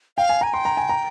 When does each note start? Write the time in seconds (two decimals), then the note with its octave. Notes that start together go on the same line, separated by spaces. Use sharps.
0.17 F5 G5
0.29 G#5
0.41 G#5 A#5
0.53 G5 C6
0.65 A#5
0.77 G#5
0.89 A#5